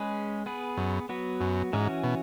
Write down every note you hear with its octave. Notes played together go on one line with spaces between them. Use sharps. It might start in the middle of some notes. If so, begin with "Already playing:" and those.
Already playing: G#3 C#4 G#4 B4
B3 G#4 B4
F#2
F#3 B3 F#4 B4
F#2
G#2 E3 C#4 F#4
B2